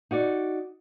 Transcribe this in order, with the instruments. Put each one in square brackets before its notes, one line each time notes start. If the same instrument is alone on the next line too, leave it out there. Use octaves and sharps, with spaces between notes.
[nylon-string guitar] D#4 F#4 D5